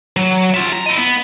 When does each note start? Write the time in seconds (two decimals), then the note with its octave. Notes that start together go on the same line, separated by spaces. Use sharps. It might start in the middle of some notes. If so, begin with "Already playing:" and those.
0.17 F#3
0.54 F4 E5
0.73 A#5
0.86 E4 D#5
0.98 B3